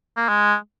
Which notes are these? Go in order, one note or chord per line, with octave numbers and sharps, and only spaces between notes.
A#3
G#3